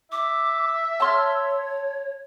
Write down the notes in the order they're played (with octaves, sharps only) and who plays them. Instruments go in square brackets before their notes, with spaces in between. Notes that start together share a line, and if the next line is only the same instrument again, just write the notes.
[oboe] E5 [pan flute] D6
[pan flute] C#5 [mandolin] A5 C6 F6